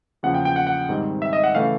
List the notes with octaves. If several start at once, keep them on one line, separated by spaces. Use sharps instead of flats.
E2 C#3 F3 A#3 F#5
G5
G5
F#5
F#5
G#2 D#3 G3 C4
E5
D#5
F#5
C#3 E3 A3 C#4 F5